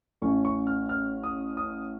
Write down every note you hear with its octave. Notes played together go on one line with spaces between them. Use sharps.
A1 A2 A3 C#4 C#6
C#6
F6
F6
D#6
D#6